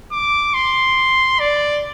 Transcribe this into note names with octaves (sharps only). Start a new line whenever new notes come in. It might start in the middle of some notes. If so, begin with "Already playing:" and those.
D6
C6
D5